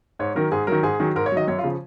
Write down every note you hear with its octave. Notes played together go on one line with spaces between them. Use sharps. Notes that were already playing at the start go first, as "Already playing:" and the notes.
G#2 C#5
D#3 F#3 A#4
G#2 G#4
D#3 F#3 A#4
G#2 G#4
D#3 F#3
G#2 A#4
C#5
D#3 F#3 D#5
F#2 C#5
F4
C#3 F3